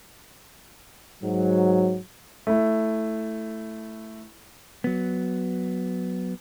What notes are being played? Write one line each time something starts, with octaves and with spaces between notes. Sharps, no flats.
G#2 F#3
A3 E4
F#3 B3